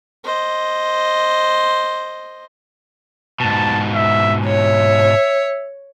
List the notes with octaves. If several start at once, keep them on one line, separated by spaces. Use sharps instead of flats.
C5 D#5
G#2 B2 A5
E5
C#5 E5